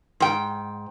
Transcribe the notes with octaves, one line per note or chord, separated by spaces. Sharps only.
G#2 G5